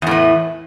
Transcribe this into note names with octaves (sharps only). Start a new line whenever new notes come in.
E2 A2 E3